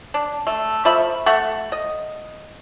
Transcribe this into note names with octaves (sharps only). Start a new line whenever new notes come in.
D4
A3
F3 A3 E5 B5
A3 F#5 C#6
D#5